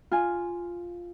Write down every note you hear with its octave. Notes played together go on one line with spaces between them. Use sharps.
F4 G#5